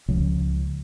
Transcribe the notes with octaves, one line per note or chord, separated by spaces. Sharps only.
C#2 C#3 F3 G#3